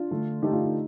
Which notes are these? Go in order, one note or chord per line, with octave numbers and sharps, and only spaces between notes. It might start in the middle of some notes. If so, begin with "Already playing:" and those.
Already playing: D4 F4
D3 A3
D3 A3 D#4 G4
D4 F4
D#4